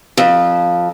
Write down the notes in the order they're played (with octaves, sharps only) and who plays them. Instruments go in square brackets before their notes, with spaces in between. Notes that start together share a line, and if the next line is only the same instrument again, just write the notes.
[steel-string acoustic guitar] F2